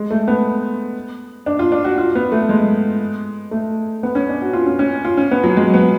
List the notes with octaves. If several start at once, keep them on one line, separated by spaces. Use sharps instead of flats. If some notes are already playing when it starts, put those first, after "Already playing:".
Already playing: G#3
A3
B3
D4
F4
D4
F#4
F4
B3
A3
G#3
A3
B3
C#4
D4
F#4
F4
C#4
C#4
F4
C#4
B3
F#3
G#3
B3